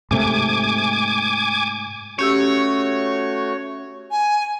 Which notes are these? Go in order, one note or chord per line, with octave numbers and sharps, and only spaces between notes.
G#2 C3 A3 G#5 D6
A3 C#4 F#4 G4 C#5 E6
G#5